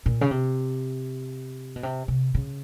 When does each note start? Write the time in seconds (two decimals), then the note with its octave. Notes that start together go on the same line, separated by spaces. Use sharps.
0.06 A#2
0.21 C#3
0.31 C3
1.76 B2
1.83 C3
2.08 C3
2.34 C#3